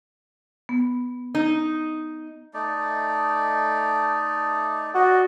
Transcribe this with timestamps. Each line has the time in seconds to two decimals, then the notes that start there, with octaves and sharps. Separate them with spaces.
0.69 B3
1.35 D#4
2.54 A3 D#4 D5
4.95 F#4 D5 D#5